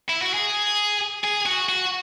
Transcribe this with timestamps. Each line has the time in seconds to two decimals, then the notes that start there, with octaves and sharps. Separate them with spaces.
0.09 E4
0.21 F#4
0.33 G#4
1.24 G#4
1.46 F#4
1.69 F#4